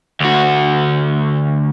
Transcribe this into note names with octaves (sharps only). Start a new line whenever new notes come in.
D2 F#4